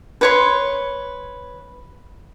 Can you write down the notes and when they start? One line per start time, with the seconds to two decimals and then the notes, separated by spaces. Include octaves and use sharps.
0.21 B4 C#5 C6